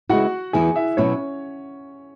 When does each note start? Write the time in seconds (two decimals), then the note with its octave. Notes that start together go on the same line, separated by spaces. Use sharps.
0.09 C#3 G#3 B3 E4 F#4 F#5
0.53 E2 E3 B3 E4 G#4 G#5
0.75 E4 E5
0.97 B2 F#3 B3 C#4 E4 C#5